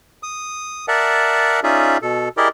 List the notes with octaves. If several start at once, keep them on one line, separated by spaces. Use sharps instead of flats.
D#6
A#4 D5 E5 F#5 A5
C#4 D#4 F4 G#4 D5 E5
B2 A4
E4 G4 G#4 A#4 D5 D#5